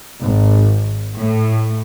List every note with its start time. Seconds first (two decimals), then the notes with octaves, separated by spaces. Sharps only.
0.20 G#1
1.18 A2